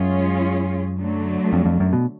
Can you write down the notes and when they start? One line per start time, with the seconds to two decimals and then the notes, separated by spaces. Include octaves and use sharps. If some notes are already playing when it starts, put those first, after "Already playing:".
Already playing: F#2 G#3 C#4 F4 G#4 C#5
0.98 D3 F#3 A3
1.53 F2
1.66 F2
1.80 F#2
1.93 B2